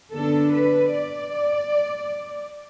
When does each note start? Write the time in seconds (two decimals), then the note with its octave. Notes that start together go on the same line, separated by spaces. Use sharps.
0.12 D3 B3 D4 A4
0.53 B4
0.93 D5